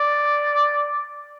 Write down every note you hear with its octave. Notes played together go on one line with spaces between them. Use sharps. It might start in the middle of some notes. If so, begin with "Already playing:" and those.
Already playing: D5